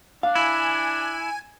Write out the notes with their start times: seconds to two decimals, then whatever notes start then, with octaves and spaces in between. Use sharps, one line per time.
0.23 D4 F5
0.35 E4 G#5